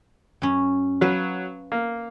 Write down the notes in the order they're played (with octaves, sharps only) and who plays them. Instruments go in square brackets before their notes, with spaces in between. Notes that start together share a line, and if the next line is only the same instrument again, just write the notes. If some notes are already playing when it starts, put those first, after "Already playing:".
[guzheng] F#2 C#4
[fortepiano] F#3 [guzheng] B4 F5 A5
[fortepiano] A#3